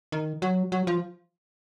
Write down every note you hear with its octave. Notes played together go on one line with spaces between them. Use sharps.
D#3
F#3
F#3
F3